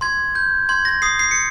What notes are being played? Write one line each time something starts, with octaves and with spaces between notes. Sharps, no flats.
C6 G#6
G6
C6 G#6
A#6
D#6 C7
C7
C#7